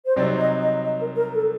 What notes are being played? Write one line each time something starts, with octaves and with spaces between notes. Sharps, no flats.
C5
C2 C3 F#3 C4 D#4 D5
D#5
D#5
D#5
A#4
A#4
A4